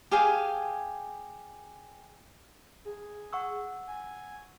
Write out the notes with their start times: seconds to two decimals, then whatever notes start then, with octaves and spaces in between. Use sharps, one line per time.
0.11 G4 G#4 F5 G#5
2.85 G#4
3.33 F#5 C#6 E6
3.87 G#5